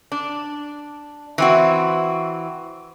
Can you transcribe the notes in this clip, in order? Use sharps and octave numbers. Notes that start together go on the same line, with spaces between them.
D4
E3 C4 F#4